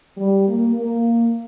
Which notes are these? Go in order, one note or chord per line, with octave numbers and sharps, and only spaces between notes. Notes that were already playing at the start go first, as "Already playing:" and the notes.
G3
A#3
A#3